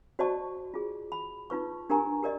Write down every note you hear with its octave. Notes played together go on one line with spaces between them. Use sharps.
F#4 C5 D5 D#5 A5 C#6
F4 G#4
B5
D#4 F4 B4 C#6
D4 G4 A#4 G#5 A#5 C#6
G4 A#4 D5 D#5